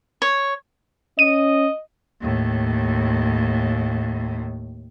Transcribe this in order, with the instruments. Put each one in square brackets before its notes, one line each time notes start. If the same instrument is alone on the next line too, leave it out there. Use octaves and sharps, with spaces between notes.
[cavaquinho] C#5
[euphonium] C#4 [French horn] D#5 [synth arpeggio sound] D#7
[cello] D#2 A2